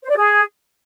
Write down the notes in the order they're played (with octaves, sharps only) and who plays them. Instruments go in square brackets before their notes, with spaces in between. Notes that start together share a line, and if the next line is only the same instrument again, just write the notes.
[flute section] C5
D5
G#4